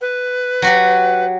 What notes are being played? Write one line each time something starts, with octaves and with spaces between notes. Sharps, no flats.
B4
F#3 F#4 G4